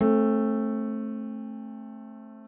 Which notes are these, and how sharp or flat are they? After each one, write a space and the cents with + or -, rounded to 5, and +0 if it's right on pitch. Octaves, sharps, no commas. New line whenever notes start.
A3 +0 C4 +35